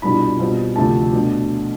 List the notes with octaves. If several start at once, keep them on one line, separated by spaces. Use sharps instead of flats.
C2 B2 G3 D4 F4 B5
B2 G3 C4 F4
D2 C3 F3 A3 A5
B2 A3 D4